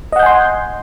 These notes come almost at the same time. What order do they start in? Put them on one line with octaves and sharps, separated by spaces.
D#5 F#5 G6 G#5 C6